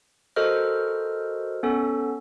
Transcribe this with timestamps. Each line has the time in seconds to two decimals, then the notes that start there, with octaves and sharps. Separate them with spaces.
0.36 F#4 A4 A#4 C5 D#5 F6
1.63 B3 C#4 A4